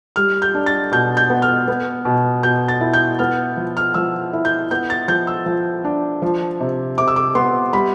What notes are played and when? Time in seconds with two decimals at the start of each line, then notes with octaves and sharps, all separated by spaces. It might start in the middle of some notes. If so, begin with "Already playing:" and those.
0.16 G3 F6
0.42 G6
0.54 D4
0.66 A6
0.92 B2 G6
1.17 G6
1.30 B3
1.42 F6
1.68 B3
2.05 B2
2.43 B2 G6
2.68 A6
2.81 E4
2.93 G6
3.19 B3 F6
3.57 F3
3.77 F6
3.94 F3 E6
4.33 E4
4.45 G6
4.71 B3 G6
4.90 A6
5.08 F3 G6
5.27 E6
5.46 F3
5.85 D4
6.22 F3
6.60 C3
6.98 C3 D6
7.08 E6
7.16 D6
7.35 B3 C6
7.73 G3 B5